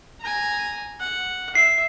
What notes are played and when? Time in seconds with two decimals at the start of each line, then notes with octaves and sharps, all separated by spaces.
0.21 G#5 A#5
1.00 F#5
1.55 E5 C7